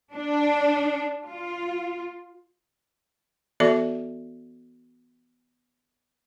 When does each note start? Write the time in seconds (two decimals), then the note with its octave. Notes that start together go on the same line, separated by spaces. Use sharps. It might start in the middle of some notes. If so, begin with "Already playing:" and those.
0.12 D4
1.26 F4
3.60 E3 B3 F#4 A4 D5 E5